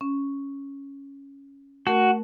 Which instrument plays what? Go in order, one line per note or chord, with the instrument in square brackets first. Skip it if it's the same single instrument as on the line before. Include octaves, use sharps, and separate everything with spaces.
[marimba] C#4
[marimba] A3 A#4 [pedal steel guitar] F#4